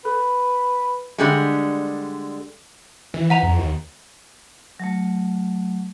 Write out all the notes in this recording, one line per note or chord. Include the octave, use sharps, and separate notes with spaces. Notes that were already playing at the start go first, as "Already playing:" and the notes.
A4 B4
D3 G3 G#3
E3
E3 F#5 A#5 F7
F2
D#2
F#3 A3